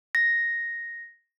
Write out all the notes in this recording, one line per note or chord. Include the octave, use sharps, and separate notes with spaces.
A#6